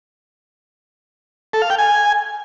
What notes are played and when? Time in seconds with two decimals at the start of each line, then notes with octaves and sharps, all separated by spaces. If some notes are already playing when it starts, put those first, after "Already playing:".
1.53 A4
1.62 F5
1.70 G5
1.78 G#5